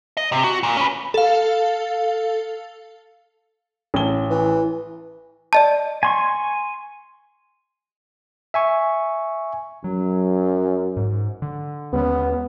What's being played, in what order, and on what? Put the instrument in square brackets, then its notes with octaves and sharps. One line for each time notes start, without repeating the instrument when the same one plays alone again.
[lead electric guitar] D#5
C3
F#4
A#2
C#4 B4
[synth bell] A4 F5
[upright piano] A1 G7
[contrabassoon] E3
[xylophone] D5 D#5 A5
[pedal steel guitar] G#5 C6 C#6
[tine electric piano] E5 G#5 C#6
[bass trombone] F#2 [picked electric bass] F#3
[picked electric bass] G#2
D3
[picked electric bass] D#2 G#3 C#4 [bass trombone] B3